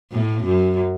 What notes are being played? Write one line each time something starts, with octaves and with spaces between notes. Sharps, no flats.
A2
F#2